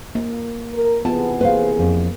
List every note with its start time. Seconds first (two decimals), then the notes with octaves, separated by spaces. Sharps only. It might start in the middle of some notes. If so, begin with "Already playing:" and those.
0.15 A#3
0.73 A#4
1.05 C3 E3 B3 F4 G#4 A5
1.41 A#3 B4 C5 F5
1.79 F2